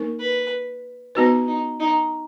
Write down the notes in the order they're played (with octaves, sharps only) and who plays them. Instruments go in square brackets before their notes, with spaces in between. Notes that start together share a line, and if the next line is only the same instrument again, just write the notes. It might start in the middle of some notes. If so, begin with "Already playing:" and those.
Already playing: [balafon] A#3 D#4 A#4
[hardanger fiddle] B4
[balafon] B3 F#4 B4 [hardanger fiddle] D#4
[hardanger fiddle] D#4
D#4